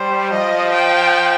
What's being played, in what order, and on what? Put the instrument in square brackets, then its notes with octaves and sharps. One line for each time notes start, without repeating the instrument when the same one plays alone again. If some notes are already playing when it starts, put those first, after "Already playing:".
Already playing: [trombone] G3 [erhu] C5
[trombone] F3 [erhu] D#5
[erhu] G5